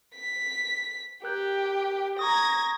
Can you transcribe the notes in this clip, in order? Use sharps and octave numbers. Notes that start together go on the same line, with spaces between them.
B6
G4 A#4 F#6 G6
A#5 C#6 D#6 G#6 A#6